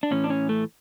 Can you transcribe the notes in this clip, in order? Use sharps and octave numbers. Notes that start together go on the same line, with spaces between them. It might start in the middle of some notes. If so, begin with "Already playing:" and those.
D4
A2 E3 C#4
D4
C#4
A3